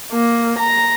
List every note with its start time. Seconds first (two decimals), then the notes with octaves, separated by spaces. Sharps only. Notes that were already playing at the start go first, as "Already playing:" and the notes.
0.13 A#3
0.59 A#5